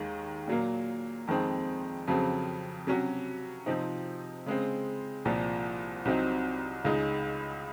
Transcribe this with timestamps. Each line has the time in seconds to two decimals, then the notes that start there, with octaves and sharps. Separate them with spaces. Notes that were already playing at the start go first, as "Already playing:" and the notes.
Already playing: D#2 D#3 G#3
0.48 A#2 F#3 A#3
1.27 F2 D#3 G#3 C4
2.07 F2 C#3 F#3 C4
2.87 C3 F#3 C#4 F#4
3.66 C3 F3 C4 D#4
4.46 C#3 G#3 C4
5.25 C2 A#2 F3
6.05 C2 C3 F#3 C4 D#4
6.85 C#2 C#3 G#3 D#4